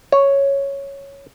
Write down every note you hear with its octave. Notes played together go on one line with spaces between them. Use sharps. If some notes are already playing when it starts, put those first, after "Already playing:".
C#5